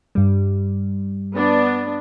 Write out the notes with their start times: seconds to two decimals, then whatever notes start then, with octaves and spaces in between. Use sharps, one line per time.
0.15 G2 G3
1.34 B3 D4